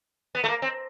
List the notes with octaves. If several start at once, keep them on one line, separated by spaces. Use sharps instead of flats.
B3
A3
A#3
C4